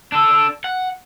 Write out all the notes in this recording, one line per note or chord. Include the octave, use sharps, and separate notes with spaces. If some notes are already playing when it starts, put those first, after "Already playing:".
D4 A4
F#5